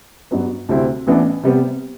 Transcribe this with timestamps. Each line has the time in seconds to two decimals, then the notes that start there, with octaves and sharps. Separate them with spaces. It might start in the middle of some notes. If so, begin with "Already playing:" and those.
0.31 G2 F#3 B3
0.69 D2 C3 G3 C4 E4
1.07 A1 A2 E3 B3 D4
1.43 C3 G3 B3